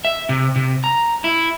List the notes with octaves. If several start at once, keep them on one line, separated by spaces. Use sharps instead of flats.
E5
C3
C3
A#5
E4